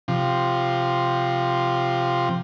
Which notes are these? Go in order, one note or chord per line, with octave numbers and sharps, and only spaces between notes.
C3 F3